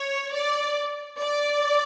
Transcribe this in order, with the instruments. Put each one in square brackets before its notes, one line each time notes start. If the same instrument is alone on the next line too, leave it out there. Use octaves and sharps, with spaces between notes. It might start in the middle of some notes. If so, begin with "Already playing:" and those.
Already playing: [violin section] C#5
D5
D5